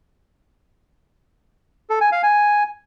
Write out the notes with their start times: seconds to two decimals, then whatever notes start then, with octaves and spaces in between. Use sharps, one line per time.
1.90 A4
2.01 G#5
2.12 F5
2.23 G#5